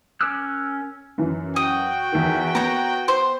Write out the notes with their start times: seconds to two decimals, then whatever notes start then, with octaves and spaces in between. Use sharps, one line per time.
0.21 C#4 A#4 D6 E6 F#6
1.18 F#2 E3
1.56 F#4 G5 D#6
2.12 E2 D#3
2.55 B3 A#4 C#5 A#5
3.08 C5 C6